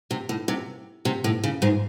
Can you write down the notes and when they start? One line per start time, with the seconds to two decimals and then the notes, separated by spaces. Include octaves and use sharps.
0.11 C3
0.29 A2
0.48 C3
1.05 C3
1.24 A2
1.44 C#3
1.62 G#2 G#3